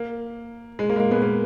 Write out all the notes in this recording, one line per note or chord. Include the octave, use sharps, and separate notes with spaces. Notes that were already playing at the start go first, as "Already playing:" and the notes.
Already playing: A#3
G#3
A#3
G#3
A#3
G#3 B3
A#3